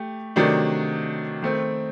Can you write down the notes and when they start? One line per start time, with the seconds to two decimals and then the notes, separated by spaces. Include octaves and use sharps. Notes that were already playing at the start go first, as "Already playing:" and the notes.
Already playing: A3 G4
0.36 C3 D#3 F#3 A3 D4
1.42 D#3 A3 C4